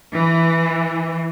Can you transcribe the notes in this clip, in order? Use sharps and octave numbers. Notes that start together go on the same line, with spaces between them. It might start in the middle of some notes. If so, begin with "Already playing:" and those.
E3